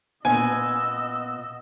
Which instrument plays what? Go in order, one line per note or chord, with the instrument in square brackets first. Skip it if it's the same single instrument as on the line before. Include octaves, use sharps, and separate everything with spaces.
[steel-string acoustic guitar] A#2 B3 [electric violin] D#5 E6 [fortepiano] G#5